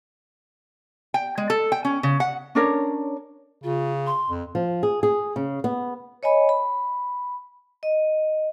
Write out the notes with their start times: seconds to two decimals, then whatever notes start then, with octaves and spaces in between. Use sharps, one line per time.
1.14 G5
1.38 G#3
1.50 A4
1.72 G5
1.85 C#4
2.03 C#3
2.20 F#5
2.55 C#4 D4 A#4 C#5
3.64 C#3 F4
4.07 C6
4.29 F2
4.55 F3
4.83 G#4
5.03 G#4
5.36 C#3
5.64 B3
6.23 C#5 D#5 G#5 B5
6.49 B5
7.83 D#5